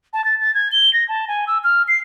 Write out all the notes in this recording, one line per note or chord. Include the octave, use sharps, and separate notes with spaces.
A5
A6
A6
G#6
G7
A#6
A5
G#5
E6
F6
C7